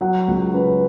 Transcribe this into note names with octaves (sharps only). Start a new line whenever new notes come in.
F#3 F#5
C#2
C#4 B4